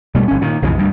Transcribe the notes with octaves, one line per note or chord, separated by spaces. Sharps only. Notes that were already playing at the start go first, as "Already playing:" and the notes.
B2 G3 A3
G1 C#4
A#2 D#3
B1 F2 C#3 E3
D2 G2 G3